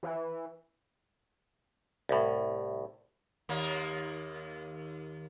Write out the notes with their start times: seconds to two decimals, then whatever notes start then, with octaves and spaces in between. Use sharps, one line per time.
0.03 E3
2.09 C2 A2
3.49 D#2 A#3